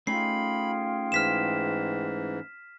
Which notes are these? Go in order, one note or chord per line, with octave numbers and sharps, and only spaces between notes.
A3 C#4 D#4 F4 G#4 G5 B5 C7
G#2 E3 F6 B6 E7